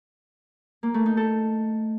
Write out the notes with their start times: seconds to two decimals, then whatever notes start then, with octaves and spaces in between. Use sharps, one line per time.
0.83 A#3
0.94 A3
1.06 D#4
1.17 A4